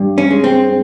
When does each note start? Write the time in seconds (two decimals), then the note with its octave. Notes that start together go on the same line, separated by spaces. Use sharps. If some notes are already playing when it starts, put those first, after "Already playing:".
Already playing: G2
0.18 C#4
0.30 G#3
0.44 C4